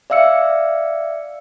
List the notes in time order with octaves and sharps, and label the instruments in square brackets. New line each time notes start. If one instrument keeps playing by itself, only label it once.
[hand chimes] D5 E5 F5 E6 C#7